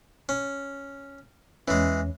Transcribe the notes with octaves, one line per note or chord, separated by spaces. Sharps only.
C#4
E2 E3 G#3 C#4